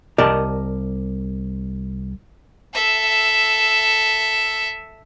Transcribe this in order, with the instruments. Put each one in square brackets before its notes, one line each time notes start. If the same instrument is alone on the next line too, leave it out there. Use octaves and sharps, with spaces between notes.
[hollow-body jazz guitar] C2 G4 A#4 D5 D#5 A5
[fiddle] A4 E5